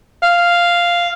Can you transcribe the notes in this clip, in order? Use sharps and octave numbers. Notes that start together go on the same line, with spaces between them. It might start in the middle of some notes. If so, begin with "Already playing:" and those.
F5